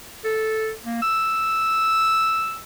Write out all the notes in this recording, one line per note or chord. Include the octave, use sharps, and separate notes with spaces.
A4
A#3
E6